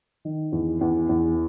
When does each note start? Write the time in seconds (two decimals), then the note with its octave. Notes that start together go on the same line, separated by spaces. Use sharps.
0.25 D#3
0.52 E2
0.81 E2
1.09 E2